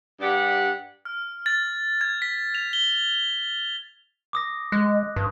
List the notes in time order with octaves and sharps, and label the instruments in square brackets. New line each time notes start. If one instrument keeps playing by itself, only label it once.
[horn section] G2 G4 D5 F#5
[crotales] F6
A6
G#6
B6
F7
G7
[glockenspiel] D6 D#6 A#6
[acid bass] G#3 [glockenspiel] F#6
[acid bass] G2